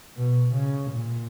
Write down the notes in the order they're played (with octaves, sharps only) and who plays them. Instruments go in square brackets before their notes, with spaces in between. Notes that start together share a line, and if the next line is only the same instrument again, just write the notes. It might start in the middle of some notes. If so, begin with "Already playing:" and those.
[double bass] B2
C#3
A#2